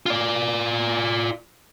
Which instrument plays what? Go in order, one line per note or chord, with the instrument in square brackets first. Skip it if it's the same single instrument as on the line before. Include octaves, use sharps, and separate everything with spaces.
[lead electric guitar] F4 D5